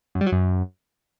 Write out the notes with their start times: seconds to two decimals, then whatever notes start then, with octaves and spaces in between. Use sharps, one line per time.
0.15 F#2
0.21 G3
0.26 F#3
0.32 F#2